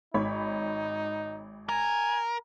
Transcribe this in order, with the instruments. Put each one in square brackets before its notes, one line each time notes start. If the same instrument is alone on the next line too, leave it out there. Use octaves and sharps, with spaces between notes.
[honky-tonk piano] G#1 C#5 B5 [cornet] D#4
[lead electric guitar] A#4 [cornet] G#5